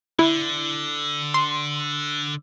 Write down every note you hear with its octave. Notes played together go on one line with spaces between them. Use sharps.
D3 E4
C6